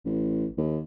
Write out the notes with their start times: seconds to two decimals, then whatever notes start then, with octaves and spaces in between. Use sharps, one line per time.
0.05 A1
0.57 D#2